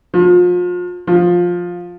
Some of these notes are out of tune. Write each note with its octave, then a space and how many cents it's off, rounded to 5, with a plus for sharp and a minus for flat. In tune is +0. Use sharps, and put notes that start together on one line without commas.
F3 +30
F3 +10